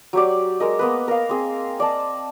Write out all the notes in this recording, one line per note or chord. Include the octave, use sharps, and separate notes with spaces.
F#3 G4 D5
G#3 A#4 D#5
A#3 B3 B4
A#4 F5
C4 G#4
D5 D#5 A5